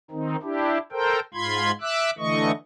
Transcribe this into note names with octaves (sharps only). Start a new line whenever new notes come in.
D#3 C4 D#4
D4 E4 G4
A4 A#4 C5 G5
G#2 F4 B5 C6 G#6
E5 D6 E6 F#6
D3 E3 A3 D#5 C#6